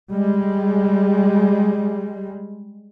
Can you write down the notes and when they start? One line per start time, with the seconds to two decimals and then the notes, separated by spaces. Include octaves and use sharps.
0.11 G3 G#3